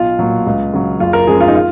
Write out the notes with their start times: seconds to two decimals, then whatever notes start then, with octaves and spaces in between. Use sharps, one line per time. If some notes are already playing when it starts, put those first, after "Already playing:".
Already playing: B1 F4
0.19 A#2 F#3
0.46 C#2
0.73 C#3 F#3
1.00 F#1 F4
1.13 A#4
1.27 F#2 F3 G#3 G#4
1.41 F4
1.48 D#4
1.55 F4